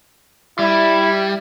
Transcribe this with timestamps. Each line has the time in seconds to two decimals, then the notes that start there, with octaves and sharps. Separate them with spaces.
0.59 G3 E4